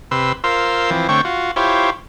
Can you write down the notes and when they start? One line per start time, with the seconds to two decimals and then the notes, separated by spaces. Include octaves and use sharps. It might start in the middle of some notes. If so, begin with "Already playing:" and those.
0.11 C3 B4 C6 E6
0.44 F4 A#4 C5 C6 E6
0.90 E3 F3 C4
1.09 D3 A3 C4 C#5 G5 C#6
1.25 F4 F#4
1.56 E4 F4 G4 C5 C#5